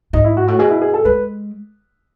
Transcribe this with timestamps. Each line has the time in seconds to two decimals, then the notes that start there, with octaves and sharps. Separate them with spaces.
0.13 G#2 D#4
0.24 E4
0.37 F#4
0.48 A2 F#4
0.59 B2 G#4
0.70 E4
0.81 G#4
0.94 A4
1.05 G#3 B4